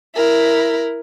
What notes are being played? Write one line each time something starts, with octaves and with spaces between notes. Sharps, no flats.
E4 A#4